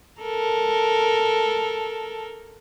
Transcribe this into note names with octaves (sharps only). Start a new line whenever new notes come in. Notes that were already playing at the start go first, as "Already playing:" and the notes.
A4 A#4